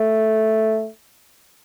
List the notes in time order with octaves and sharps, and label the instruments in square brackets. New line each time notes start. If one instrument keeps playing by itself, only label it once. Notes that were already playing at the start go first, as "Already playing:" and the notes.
Already playing: [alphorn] A3